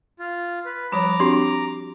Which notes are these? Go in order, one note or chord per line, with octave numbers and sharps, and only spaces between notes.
F4
B4
F3 G3 C#5 A#5 B5 D6
C4 D4 F#4 G4 C6